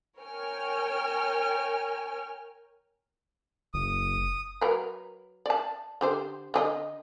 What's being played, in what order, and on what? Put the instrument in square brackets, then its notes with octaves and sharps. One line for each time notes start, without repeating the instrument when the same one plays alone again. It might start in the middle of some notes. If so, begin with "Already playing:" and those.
[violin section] A#4 C#5 G5 G#5 F6
[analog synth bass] F#1 [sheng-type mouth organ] D#6
[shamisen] F#3 A#4 B4
D5 A5
D3 G4 C5
D3 G4 D#5